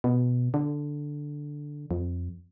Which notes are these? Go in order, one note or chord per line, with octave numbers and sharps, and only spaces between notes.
B2
D3
F2